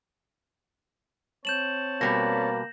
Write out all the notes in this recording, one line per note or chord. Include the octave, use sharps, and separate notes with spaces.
C4 C#5 A5 G6 E7 F#7
B2 G3 A#3 B4 A#6